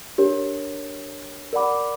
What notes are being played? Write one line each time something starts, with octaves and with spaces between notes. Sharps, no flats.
D4 G4 A#4 C#5
A#4 D5 F#5 B5 D6